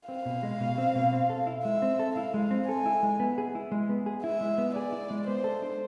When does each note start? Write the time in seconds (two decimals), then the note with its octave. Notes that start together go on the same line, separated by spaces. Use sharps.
0.09 C4 F5
0.26 B2
0.43 G#3
0.60 B2
0.78 C4
0.95 B2
1.13 C4
1.30 A4
1.47 E4
1.64 G#3 E5
1.82 C4
2.00 A4
2.16 E4 F5
2.34 G#3
2.51 C4
2.68 A4 G#5
2.86 E4
3.03 G#3
3.20 B3
3.38 G#4
3.55 E4
3.72 G#3
3.90 B3
4.06 G#4
4.24 E4 E5
4.41 G#3
4.58 B3
4.76 G#4 D5
4.92 E4
5.10 G#3
5.28 B3 C5
5.44 A4
5.62 D4